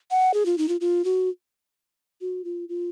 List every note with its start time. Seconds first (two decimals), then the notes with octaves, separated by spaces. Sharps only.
0.11 F#5
0.34 G#4
0.46 F4
0.58 D#4
0.68 F4
0.81 F4
1.05 F#4
2.21 F#4
2.44 F4
2.69 F4